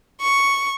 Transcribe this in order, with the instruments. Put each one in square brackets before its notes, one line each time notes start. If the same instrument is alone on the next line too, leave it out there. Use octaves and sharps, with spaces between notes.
[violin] C#6